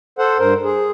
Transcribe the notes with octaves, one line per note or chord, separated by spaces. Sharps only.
A4 C5 F#5
G2 A#4 C5
G#4